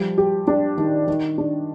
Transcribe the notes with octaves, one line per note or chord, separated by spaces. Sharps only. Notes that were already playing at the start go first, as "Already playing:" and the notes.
Already playing: F3 G3
G4
D4
D#3
D#3
D4